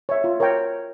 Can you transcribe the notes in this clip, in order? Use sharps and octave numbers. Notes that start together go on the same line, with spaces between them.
C#5 E5
F4
A#4 C#5 G5 A#5